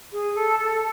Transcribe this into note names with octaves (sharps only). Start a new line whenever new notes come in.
G#4
A4
A4